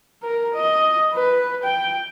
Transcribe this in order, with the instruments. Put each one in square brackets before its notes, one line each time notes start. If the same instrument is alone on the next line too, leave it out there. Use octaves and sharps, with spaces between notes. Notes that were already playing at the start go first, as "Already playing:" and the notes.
[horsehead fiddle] A#4
D#5
B4
G5